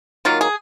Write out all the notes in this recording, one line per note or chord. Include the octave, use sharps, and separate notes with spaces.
D#3 F#3 A#3 F4
G#4